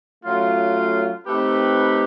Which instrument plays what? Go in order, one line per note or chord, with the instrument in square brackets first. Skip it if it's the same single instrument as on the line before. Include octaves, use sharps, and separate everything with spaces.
[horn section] F#3 A3 C#4 F4
A3 C4 D#4 G4 B4